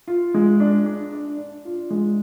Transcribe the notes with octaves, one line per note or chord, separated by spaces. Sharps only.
F4
G#3
D4
D4
D4
D4
F4
G#3